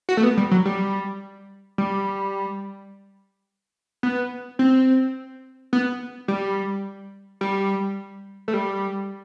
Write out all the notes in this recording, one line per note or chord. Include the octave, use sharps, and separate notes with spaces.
F#4
A3
B3
G3
F#3
G3
G3
B3
C4
B3
G3
G3
A3
G3